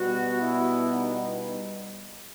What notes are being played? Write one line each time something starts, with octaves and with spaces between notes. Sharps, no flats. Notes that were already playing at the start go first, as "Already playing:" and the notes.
Already playing: B2 G3 B3 F#4
E4
D#4